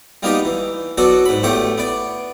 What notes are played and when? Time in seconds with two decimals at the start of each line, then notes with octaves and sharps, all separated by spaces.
0.23 G3 A#3 B3 D#4 G4 D#5
0.45 E3
0.97 F#3 B3 F#4 A4 D5
1.25 G#2 B5
1.43 E2 A2 A3 G4 D6 D#6
1.78 B3 D5